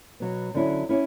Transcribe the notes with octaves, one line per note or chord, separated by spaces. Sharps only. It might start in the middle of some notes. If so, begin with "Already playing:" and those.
B2 F#3 B3
D3 F#3 C#4 E4
C#4 E4